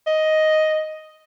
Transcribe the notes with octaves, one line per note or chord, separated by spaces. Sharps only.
D#5